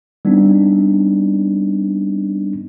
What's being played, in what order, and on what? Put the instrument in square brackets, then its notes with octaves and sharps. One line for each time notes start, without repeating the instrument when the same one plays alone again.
[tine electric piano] G3 B3 C4 D4 D#4